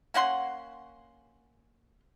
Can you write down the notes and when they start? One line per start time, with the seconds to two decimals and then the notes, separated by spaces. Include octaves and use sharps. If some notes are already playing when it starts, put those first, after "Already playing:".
0.14 A#3 C#4 F#5 C6